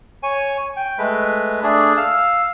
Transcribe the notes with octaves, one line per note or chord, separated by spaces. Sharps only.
C#5 G#5
G5
G#3 A3 B4
A3 D4 G#4
F5 E6